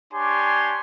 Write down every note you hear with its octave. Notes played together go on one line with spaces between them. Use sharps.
D4 G4 C#5 G#5 C6